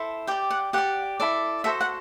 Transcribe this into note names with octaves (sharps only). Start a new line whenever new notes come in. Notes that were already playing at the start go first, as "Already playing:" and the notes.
Already playing: E4 A4 C5
G4 D5 G5
F#5
G4 D5 F#5
E4 A4 D5
F#4 A4 C5 E5
F#5